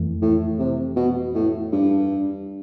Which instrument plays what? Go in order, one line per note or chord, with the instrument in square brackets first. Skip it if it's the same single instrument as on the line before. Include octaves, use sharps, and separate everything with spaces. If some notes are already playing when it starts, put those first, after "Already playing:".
Already playing: [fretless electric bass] F2 E3 A3
[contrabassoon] A2
C3
B2
A2
G2